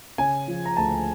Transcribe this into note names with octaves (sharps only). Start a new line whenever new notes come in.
C#3 G#5
F3
A#5
D2 A5